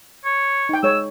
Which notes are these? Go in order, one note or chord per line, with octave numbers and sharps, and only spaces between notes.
C#5
D#4 G5
G#3 C#5 E6